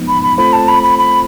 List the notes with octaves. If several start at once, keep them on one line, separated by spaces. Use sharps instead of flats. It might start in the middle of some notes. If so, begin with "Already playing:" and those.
Already playing: F3 G#3 B3 D#4
B5
B5
A3 C4 F4 A4 C5 B5
A5
B5
B5
B5